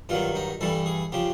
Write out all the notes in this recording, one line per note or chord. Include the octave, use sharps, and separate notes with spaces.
G2 D#3 F#3 F4
D#4
G2 E3 G3 A4
G#4
C#3 F3 G4